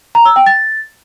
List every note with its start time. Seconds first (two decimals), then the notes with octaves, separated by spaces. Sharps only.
0.15 A#5
0.25 E6
0.36 G5
0.47 A6